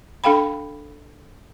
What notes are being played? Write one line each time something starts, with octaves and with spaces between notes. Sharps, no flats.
D4 A4 F5 G5 B5